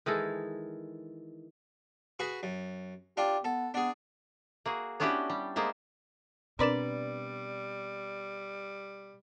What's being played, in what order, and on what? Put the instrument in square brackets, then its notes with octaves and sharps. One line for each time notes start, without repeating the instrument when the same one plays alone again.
[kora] D#3 E3 G#3 A4
[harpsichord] F#4 G#4 B4
F#2
[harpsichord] D4 F4 [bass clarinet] G4
[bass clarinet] B3 [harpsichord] A4
[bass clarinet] B3 [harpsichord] D4 G#4
[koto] A#3 F#4 G#4
B3 C#4 D4 E4 F#4 G4
G3
G#3 A#3 B3 C5 E5
[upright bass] B2 [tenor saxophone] G3 [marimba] C4 D4 [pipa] A#4 B4 D5